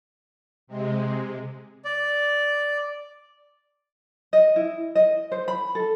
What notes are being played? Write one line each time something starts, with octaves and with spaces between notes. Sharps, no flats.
C3 G#3
D5
D#5
E4
D#5
C5
B5
A4